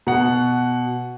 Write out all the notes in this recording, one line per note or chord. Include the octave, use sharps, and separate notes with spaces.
B2 F#5